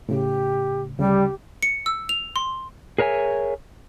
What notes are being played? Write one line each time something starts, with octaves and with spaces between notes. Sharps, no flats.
A2 C#3 G4
D2 C#3 G3 G4
C#7
E6
F7
C6
G#4 A#4 C#5 E5 G#5